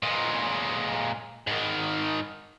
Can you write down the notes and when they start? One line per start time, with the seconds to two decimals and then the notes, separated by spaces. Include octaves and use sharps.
0.03 A#2 G#3
1.47 G#2 D#3